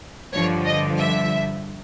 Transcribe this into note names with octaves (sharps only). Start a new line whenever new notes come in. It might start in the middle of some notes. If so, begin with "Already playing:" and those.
G2 D3 F3 C#5
D#5
E5